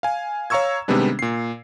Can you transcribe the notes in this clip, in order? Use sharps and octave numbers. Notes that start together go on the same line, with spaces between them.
F5 G#5
C#5 F5 A#5 C#6 E6 G#6
C3 D#3 G3 G#3 B3 D4
A#2 C7